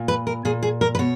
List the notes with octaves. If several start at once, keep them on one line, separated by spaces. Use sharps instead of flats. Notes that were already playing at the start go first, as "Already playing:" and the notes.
Already playing: A#2
B4
A#4
A#2 G#4
G#4
A#4
B4
B2 C#5